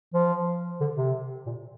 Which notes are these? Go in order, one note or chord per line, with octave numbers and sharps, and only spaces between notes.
F3
D3
C3
A#2